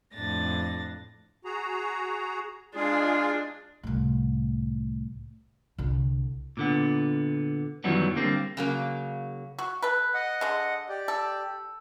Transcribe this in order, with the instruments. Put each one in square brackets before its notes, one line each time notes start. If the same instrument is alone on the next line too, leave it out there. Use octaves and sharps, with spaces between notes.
[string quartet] F2 A2 D4 A6 A#6
[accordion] F#4 G#4 A#5
[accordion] G#3 F4 G#4 [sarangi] D4
[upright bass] C2 A2
C2 D3
[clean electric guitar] A#2 D3 B3
F#2 D#3 E3 F#3 G3 B3
D3 G3 A#3 C4
[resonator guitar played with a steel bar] C#3 F#3 A#3
[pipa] F#4
A4 B4
[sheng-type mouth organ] D#5 F#5
[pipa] D3 G#3
[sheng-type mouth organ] G4 D5
[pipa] A4